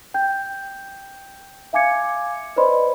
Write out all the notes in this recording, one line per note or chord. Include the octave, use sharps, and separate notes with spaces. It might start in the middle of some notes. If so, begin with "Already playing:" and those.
G5 G6
E5 F5 G#5 D6 G#6 C#7
B4 C5 D5 D#5 B5 C6